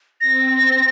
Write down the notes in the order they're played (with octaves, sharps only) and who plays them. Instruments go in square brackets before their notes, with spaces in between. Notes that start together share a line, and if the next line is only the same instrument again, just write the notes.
[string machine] C4 [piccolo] A#6